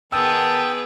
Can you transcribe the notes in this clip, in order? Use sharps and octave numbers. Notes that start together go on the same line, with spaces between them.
D#3 B3 G#4 G5 A5 D#6 E6